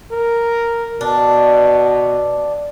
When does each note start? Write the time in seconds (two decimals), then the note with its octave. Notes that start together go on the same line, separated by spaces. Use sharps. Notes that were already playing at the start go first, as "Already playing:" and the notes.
0.11 A#4
1.01 B2 D4